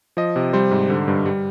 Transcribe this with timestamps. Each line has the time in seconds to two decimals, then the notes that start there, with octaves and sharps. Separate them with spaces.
0.17 F3 D#5
0.36 C3
0.53 G3 C5
0.71 G#2
0.89 D3
1.08 G2
1.26 G3